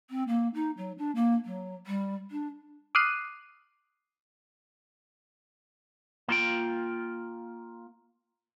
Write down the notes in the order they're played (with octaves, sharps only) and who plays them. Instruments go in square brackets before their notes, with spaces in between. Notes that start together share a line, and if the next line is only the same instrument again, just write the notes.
[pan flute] C4
A#3
D#4
F#3
D4
A#3
F#3
G3
D4
[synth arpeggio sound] D6 D#6 F6 F#6 C7 D#7
[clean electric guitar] A#3 F4 G5